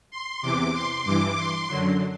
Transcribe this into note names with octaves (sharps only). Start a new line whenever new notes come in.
C6
E2 C3 E3 D6
C6
G2 E3 D6
C6
F#2 D3 F#3